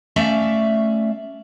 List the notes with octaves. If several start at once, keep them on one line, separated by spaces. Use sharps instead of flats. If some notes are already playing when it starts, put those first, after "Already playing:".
A3 C#4 D5 E5 F5